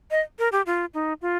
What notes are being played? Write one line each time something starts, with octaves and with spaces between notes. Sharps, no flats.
D#5
A#4
G4
F4
D#4
F4